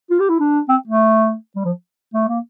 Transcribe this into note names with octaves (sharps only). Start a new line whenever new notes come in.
F4
G4
E4
D4
C4
A3
G3
F3
A3
A#3